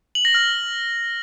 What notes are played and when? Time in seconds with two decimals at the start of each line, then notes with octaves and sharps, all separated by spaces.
0.15 F#7
0.25 A#6
0.34 F6